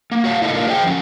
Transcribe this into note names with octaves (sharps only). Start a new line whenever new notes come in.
A#3
F#4 C#5 F5
E4 F4 A4 D#5
A3 A#3 D4 F4 G4 A#4
G#4 C5 D#5 F#5 G5
F3 C#4